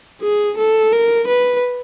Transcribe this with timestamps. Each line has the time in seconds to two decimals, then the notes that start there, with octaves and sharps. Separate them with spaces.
0.22 G#4
0.58 A4
0.93 A#4
1.28 B4